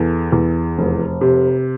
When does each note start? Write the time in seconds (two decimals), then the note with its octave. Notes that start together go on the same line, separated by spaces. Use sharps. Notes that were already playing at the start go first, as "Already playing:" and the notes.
Already playing: E2 A4
0.32 E2
0.78 F1
1.21 C3